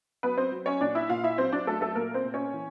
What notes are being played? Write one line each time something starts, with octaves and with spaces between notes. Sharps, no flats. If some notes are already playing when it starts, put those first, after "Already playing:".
F#3 B3 B4
C4 C5
F#3
C#4 C#5
A#2 D4 D5
E4 E5
A#2 F4 F5
E4 E5
F#3 C4 C5
D4 D5
F#3 A3 A4
A3 A4
A#2 A#3 A#4
C4 C5
A#2
C#4 C#5
E3